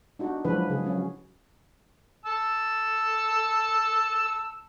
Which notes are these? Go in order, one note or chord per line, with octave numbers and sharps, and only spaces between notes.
D4 D#4 F#4
F3 F#3 G#3 D4 E4 B4
C#3 G#4
F#3 C#4
A5 E6